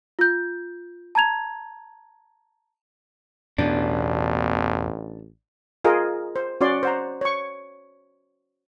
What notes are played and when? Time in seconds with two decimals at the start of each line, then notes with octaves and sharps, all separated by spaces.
0.19 F4 G6
1.15 A5 A#5 G#6 F7
3.58 A1 E2 B2 D4
5.84 F4 G#4 A#4 D#5
6.36 C5
6.61 C#4 F#4 C#5 D5 C6
6.83 C5 F#5 A#5
7.21 C#5 C#6